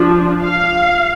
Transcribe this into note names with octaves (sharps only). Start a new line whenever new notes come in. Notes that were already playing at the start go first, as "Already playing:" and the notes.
Already playing: F3 D4
F5